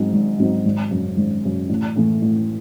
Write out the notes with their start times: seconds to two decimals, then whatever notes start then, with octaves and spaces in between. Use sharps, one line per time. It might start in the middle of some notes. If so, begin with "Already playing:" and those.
Already playing: G#2 F#3 C4 D#4
0.13 G#1
0.38 G#2 F#3 C4 D#4
0.65 G#1
0.91 F#2 C#3
1.17 G#1
1.44 F#2 C#3
1.69 A1
1.96 A2 E3 A3
2.22 A1